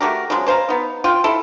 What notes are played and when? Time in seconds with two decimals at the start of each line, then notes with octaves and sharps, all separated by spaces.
0.01 A3 F#4 G4 A#4
0.30 C#3 F3 F#3 G#3
0.47 B2 C5 F5 A#5
0.69 B3 D#4
1.04 F4 G5
1.24 E4 A4